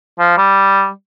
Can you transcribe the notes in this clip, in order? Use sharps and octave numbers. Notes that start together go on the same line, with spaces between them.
F3
G3